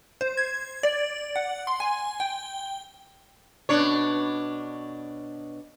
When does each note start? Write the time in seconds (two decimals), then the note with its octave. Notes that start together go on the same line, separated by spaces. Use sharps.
0.21 C5
0.37 G#6
0.83 D5
1.36 F#5
1.67 C6
1.80 G#5
2.20 G5
3.69 B2 D4 C#5